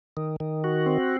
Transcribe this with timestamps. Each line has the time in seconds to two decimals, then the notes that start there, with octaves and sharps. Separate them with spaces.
0.17 D#3
0.40 D#3
0.64 F#4
0.86 C4